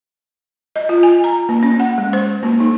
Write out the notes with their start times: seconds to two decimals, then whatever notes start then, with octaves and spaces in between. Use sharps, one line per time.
0.76 D#5
0.89 F4
1.03 G#5
1.24 A#5
1.49 A#3
1.63 C#4
1.80 F#5
1.98 G#3
2.13 C5
2.43 A#3
2.60 D#4